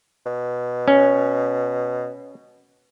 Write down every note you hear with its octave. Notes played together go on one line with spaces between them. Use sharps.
B2
C#4